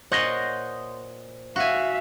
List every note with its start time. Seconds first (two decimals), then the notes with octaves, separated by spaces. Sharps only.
0.12 A#2 C5 C#5 D#5 F#5
1.56 F#4 E5 F5 G#5